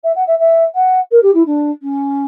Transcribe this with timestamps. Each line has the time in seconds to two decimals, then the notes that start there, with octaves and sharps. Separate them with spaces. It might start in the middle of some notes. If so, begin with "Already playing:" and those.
0.03 E5
0.15 F#5
0.27 E5
0.39 E5
0.74 F#5
1.11 A#4
1.22 G4
1.34 E4
1.46 D4
1.82 C#4